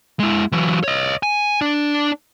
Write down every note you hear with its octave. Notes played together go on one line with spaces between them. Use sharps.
G#3 E4
E3 F#3
C#5 D#5
G#5
D4 D5